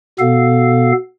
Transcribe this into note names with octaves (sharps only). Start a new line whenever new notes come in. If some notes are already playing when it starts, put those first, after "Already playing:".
B2 B3 A4 F5